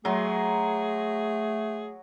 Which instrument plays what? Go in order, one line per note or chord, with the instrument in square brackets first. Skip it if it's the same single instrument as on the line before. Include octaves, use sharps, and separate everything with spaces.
[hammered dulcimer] F#3 C6 [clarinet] A3 [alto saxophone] G#4